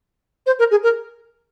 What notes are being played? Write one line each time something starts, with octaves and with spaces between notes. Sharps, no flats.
C5
A#4
G#4
A#4